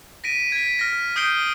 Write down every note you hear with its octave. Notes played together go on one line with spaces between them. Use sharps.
A#6 B6 D7 D#7
G#6 B6
F6 A#6
D#6 F6 G6 C7 D7 G7